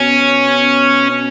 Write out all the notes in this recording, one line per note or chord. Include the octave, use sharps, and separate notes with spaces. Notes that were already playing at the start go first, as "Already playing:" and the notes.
Already playing: B2 C#4